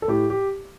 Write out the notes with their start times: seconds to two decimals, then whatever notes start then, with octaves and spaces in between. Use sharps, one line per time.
0.02 A4
0.08 A2 G4
0.30 G4